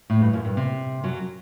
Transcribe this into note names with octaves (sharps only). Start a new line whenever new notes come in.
A2
G2
F#2
G2
C3
F#2 F#3